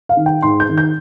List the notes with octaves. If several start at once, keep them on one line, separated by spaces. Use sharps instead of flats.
F5
D#3
G5
G#2 C6
G6
D#3
G6